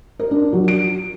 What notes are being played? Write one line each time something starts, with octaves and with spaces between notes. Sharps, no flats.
A#4
D4
F#3
D7